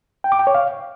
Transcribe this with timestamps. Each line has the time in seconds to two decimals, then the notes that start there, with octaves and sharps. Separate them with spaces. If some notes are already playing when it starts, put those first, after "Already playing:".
0.24 G5
0.32 D6
0.39 G5
0.47 C#5
0.54 F5